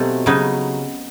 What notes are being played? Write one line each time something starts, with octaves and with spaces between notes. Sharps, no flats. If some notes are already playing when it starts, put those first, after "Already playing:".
Already playing: B2 F#3 A3 C4 D#4 G4
C#3 F#3 B3 D#4